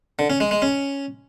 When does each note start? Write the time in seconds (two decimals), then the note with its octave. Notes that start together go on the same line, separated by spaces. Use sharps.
0.19 D3
0.30 C#4
0.40 G#3
0.51 G#3
0.62 C#4